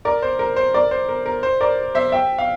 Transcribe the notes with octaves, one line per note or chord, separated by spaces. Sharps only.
A#4 D5
C5
A#4
C5
A#4 D5
C5
A#4
A#4
C5
A#4 D5
C5 E5
E5 G5
F5